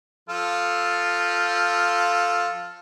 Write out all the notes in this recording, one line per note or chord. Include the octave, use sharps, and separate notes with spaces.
F3 F4 A4